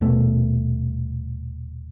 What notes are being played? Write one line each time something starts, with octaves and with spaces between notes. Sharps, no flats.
D#1 B2 A3